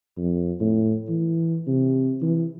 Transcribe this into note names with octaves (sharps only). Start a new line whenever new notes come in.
F2
A2
E3
C3
E3